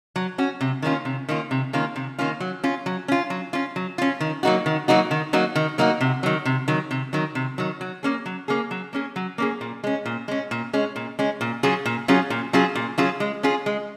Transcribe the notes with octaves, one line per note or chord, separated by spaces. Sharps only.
F#3
C#4 F#4
C3
D#3 A#3 C#4 F4
C3
D#3 A#3 C#4 F4
C3
D#3 A#3 C#4 F4
C3
D#3 A#3 C#4 F4
F#3
C#4 F4
F#3
C#4 F4
F#3
C#4 F4
F#3
C#4 F4
D#3
F#3 A#3 D#4 F#4
D#3
F#3 A#3 D#4 F#4
D#3
F#3 A#3 D#4 F#4
D#3
F#3 A#3 D#4 F#4
C3
D#3 F#3
C3
D#3 F#3
C3
D#3 F#3
C3
D#3 F#3
F#3
A#3 C#4 G#4
F#3
A#3 C#4 G#4
F#3
A#3 C#4 G#4
F#3
A#3 C#4 G#4
A#2
G#3 C#4
A#2
G#3 C#4
A#2
G#3 C#4
A#2
G#3 C#4
A#2
F#3 C#4 F4 G#4
A#2
F#3 C#4 F4 G#4
A#2
F#3 C#4 F4 G#4
A#2
F#3 C#4 F4 G#4
G#3
C#4 F4 G#4
G#3